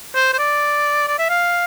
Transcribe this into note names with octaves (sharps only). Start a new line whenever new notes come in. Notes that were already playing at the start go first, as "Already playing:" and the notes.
C5
C5
D5
D5
E5
F5